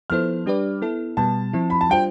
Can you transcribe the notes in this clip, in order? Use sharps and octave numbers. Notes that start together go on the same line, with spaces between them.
F3 B3 E4 A4 C5 F6
G3 D4 G4 B4 D5
B3 E4 A4
B2 G3 B3 A5
F3 C4 E4
B5
A5
G3 D4 F4 C5 G5